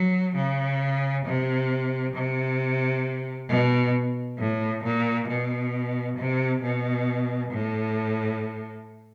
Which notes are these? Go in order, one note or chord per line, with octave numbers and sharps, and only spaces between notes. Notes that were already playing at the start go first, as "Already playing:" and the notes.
Already playing: F#3
C#3
C3
C3
B2
A2
A#2
B2
C3
B2
A2